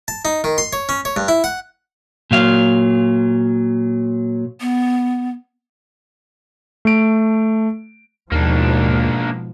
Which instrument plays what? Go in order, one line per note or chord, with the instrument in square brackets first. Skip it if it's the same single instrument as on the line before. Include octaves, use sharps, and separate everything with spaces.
[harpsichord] A5
D#4
D#3
C6
C#5
C#4
C#5
G2
E4
F#5
[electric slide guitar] A#2 F#3 F5
[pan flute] B3
[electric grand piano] A3 D7
[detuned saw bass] D#2 [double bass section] G#2 B2 F3 [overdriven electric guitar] A#3 D4